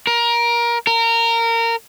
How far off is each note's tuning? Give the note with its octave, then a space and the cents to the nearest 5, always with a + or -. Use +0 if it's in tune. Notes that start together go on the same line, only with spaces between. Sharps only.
A#4 +20
A#4 -20